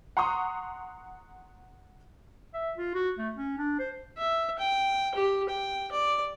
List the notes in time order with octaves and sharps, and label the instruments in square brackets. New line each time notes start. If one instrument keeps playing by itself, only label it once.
[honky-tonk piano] F#5 A#5 C6 C#6 D#6
[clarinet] E5
F4
F#4
A3
C#4
D4
C5
[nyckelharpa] E5
G5
G4
G5
D5